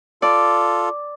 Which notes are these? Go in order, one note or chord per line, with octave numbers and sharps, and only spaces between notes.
F4 A4 D5